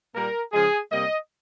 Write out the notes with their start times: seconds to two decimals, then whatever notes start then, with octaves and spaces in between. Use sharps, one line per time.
0.14 A#2 G3 A#3 A#4
0.52 C#3 F3 G#3 G#4
0.90 C3 G3 A#3 D#5